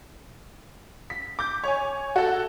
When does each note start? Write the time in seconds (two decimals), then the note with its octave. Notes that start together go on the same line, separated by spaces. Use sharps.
1.10 B6
1.39 D6 G6
1.64 C#5 G#5
2.16 F#4 A4